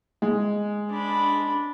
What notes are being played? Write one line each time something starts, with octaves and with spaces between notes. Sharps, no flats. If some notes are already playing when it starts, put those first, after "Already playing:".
G#3
D4 B5